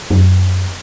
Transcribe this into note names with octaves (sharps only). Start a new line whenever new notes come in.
F#2